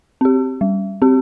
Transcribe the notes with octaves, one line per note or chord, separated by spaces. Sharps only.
C4 G4
G3
C4 G4